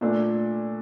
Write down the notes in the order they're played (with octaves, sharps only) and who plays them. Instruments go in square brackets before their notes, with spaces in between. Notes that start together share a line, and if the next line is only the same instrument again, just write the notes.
[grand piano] A#2 A3 D4 A4